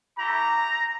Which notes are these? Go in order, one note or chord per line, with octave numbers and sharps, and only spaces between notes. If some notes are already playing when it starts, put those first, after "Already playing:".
A3 E4 G4 A#5